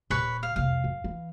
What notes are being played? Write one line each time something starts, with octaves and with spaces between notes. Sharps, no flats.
D#1 B4 C#5 C#6
F5
C2 F2 F5
F#2
E3